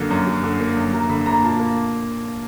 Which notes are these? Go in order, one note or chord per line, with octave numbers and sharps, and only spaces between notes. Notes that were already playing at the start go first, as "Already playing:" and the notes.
Already playing: F#2 D3 F#3 A#3
F#2
F#3
D3
A#3
F#2
F#3 A#5
D3 B5
A#3 A#5
A#2 A5
A#3